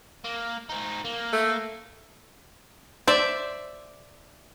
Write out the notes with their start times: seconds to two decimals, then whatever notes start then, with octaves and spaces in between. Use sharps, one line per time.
0.24 A#3
0.69 C4 D#4
1.05 A#3
1.33 A3
3.08 C5 D5 E5